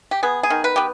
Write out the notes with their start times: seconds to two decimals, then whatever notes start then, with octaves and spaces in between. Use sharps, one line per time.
0.11 G4
0.23 B3 G#4
0.43 G#4
0.50 D#3
0.64 B4
0.76 B3 G4